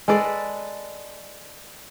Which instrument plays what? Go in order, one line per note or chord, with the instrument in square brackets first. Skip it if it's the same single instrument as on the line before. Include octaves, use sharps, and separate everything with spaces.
[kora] G#3 A4 B4 D5